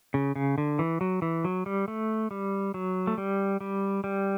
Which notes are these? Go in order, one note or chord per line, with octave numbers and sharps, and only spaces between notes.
C#3
C#3
D3
E3
F#3
E3
F#3
G3
A3
G3
F#3
A3
G3
G3
G3